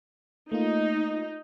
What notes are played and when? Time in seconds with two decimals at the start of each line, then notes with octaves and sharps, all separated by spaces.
0.52 A3 A#3 D#4 F4